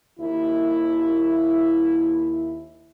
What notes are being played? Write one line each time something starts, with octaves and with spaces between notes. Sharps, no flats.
D#2 E4